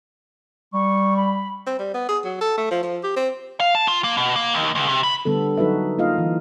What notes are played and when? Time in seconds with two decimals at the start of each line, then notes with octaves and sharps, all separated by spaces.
0.73 G3 C#6
1.17 B5
1.67 C4
1.79 G3
1.94 B3
2.09 G#4
2.25 F#3
2.41 A4
2.57 A3
2.71 F3
2.83 F3
3.03 G4
3.16 C4
3.60 F5
3.75 A5
3.88 F4
4.04 A#3
4.17 B2
4.36 A#3
4.54 D#2
4.75 C#2
4.89 C3
5.03 B5
5.25 D3 G3 B3 A4
5.58 F#3 D#4 F#4 A4 B4 E5
5.98 A#3 D#4 F4 D#5 F5
6.18 E3